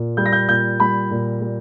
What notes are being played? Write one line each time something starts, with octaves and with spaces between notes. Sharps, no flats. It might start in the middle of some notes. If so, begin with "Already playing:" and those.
Already playing: A#2
G3 G6
A#6
G6
A#2 G6
G3 B5
A#2
G3